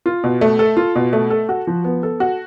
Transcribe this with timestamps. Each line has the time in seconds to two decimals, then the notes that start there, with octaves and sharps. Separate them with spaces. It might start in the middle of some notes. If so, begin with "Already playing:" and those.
0.06 F4
0.24 B2
0.41 A3
0.59 A4
0.77 F4
0.95 B2
1.13 A3
1.30 A4
1.49 F#4
1.67 F3
1.84 B3
2.03 A4
2.20 F#4